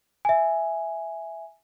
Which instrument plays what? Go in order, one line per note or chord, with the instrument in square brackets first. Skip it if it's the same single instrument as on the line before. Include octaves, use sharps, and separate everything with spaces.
[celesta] E5 G#5